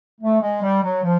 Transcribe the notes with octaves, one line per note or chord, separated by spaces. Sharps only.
A3
G#3
G3
F#3
F3